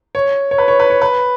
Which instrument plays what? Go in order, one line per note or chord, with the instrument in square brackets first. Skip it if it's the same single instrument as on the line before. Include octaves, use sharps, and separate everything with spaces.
[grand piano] C#5
C#5
B4
C#5
B4
C#5
B4